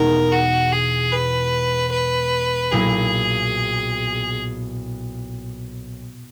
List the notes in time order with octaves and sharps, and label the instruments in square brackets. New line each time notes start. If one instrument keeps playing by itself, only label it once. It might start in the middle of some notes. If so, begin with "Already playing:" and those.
Already playing: [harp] E2 B2 G#3 D#4 [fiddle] A#4
[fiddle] F#4
G#4
B4
B4
[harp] B1 A#2 A#3 E4 [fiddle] G#4